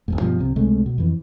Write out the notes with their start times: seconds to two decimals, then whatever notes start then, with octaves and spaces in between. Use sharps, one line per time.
0.08 A1 E2 G#2
0.21 G2 B2 F3
0.39 C2 C3
0.56 C#2 C3 G#3 A3
0.86 B2
0.98 F2 E3